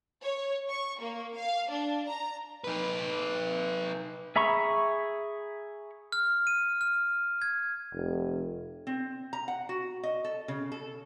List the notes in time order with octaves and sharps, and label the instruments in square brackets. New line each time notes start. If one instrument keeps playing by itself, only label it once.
[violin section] C#5
C#6
A#3
F5
D4
A#5
[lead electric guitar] D#4 B4
[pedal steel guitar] G#4 E5 A#5 B5 C#6
[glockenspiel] F6
D#7
F6
G#6
[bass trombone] F1
[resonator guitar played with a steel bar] C4
A#5
F#5
F#4
D#5
A4
C#3
A4